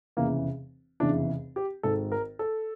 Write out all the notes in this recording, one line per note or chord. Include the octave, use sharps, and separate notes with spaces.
F1 E2 C#3 E3 A#3
F1 E2 C#3 E3 D4
G4
G#1 G#2 D#3 A4
A#4
A4